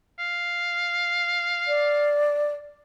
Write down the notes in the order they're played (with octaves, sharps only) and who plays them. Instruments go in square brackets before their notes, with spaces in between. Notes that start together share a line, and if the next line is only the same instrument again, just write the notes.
[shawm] F5
[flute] D5